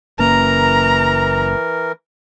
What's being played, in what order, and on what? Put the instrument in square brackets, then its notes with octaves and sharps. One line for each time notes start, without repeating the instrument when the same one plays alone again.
[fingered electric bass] F#1 C#3 A#3 [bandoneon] E3 A#4 [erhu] A#5